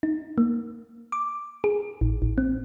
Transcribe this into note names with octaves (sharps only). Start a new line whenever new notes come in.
D#4
A#3
D6
G#4
A1
A1
C4